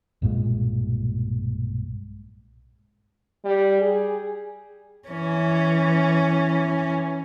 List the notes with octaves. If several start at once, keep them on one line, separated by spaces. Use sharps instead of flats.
B1 G2 A#2 G#3
G3
G#4
E3 C#4